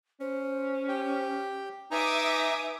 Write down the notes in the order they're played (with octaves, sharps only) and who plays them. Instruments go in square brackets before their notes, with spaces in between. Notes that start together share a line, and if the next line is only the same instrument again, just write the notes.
[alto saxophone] C#4 [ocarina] C5
[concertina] G4 G5
[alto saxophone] D#4 [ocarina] B4 [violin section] E5 D6 D#6 [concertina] G#5 A#5